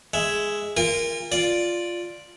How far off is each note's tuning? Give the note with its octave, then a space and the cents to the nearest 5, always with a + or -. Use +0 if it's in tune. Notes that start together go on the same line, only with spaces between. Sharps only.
G#3 +0 E5 +0
F4 -20 A#4 +0 G#5 -45
F4 +0 D5 +0